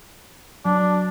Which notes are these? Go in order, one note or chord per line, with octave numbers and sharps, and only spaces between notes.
F#3 D4